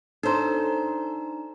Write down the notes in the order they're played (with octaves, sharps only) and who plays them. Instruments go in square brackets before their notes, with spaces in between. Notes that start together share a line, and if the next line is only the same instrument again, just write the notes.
[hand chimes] D4 D#4 A#5 [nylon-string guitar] A4 C5